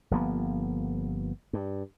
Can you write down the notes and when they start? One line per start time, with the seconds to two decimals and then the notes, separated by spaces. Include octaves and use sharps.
0.11 G1 F3 A#3 B3
1.53 G2